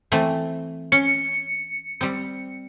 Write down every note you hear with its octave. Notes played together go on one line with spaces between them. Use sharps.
E3 A3 C4
C#4 C#7
G3 C4